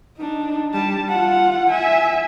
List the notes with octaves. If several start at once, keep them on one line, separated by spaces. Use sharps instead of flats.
D4 D#4
G3 A5
F4 F#5
E5 G#5